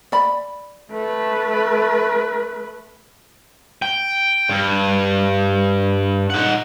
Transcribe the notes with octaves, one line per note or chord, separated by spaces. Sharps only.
D5 B5
A3 B4
G5
G2
D#4 F#5